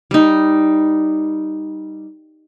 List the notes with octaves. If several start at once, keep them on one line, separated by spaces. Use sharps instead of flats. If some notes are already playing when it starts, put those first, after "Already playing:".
G3 D#4